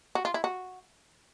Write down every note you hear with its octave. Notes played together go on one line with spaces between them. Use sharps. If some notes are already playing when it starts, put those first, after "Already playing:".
F#4
F4
E4
F#4